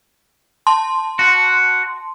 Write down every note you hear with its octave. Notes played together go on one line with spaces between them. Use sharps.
A5 C6
F#4